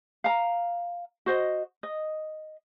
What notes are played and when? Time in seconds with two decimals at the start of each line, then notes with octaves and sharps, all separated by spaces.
0.24 F5 A#5
1.26 F#4 C5 D#5
1.83 D#5